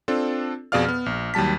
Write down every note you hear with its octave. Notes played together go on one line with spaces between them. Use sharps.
C4 D4 F4 A4
F2 B2 G#4 D5 F5 F6
B3
A#1
D#2 F#3 G3 A5 B6